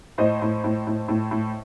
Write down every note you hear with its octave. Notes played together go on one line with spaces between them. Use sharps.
A2 C5 D#5
A2
A2
A2
A2
A2